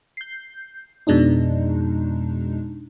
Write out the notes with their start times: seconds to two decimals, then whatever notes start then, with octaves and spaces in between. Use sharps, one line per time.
0.17 G6 C7
1.07 F2 B2 G#3 D4 D#4